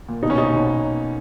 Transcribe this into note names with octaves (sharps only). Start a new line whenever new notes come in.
A#2
B2 D#4
C#4
B1 D#4
B2